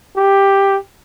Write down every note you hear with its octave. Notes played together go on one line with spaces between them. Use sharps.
G4